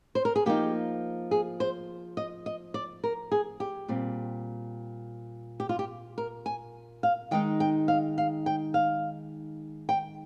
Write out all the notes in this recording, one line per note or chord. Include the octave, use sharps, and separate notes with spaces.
C5
A#4
G#4
F3 A#3 D#4 G4
G#4
C5
D#5
D#5
D5
A#4
G#4
G4
A#2 G3 C4
G4
F4
G4
A#4
G#5
F5
D#3 G#3 D#4 G5
G5
F5
F5
G5
F5
G5